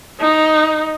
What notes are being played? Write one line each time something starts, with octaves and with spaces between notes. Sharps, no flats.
D#4